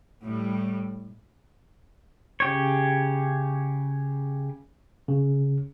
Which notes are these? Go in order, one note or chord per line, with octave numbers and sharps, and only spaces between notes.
A2 G3
C#3 G4 C#5
C#3